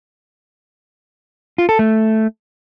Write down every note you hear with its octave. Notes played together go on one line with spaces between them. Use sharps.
F4
A4
A3